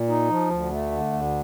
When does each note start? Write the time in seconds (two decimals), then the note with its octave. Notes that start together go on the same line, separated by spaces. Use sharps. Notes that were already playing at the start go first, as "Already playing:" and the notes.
Already playing: A#2
0.09 D#4
0.29 F3
0.50 D2
0.71 A3
0.92 D3
1.13 D2